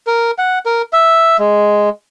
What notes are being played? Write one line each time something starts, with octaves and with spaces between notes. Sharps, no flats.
A#4
F#5
A#4
E5
G#3